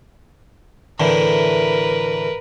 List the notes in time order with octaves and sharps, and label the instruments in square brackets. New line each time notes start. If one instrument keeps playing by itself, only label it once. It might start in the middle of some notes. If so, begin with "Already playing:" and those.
[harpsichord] A2 D3 E3 [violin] A#4 B4